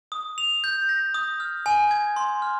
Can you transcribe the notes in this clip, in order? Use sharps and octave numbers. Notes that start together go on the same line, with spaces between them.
D#6
F7
G6
A#6
D#6
F6
G#5
G#6
C6
F6